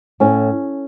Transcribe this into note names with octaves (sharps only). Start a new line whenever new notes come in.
A2 C#4